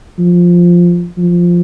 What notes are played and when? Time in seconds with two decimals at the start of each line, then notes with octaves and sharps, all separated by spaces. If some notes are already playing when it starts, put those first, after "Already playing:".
0.19 F3
1.18 F3